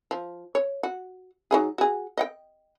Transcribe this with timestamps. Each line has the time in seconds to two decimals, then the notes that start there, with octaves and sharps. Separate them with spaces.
0.11 F3
0.55 C#5
0.83 F#4
1.51 F#3 D#4 G#4
1.78 F#4 G#4
2.18 D#5 F#5 G5